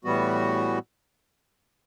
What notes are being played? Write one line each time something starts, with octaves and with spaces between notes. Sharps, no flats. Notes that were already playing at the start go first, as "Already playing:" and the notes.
A2 E3 G3 B3 F#4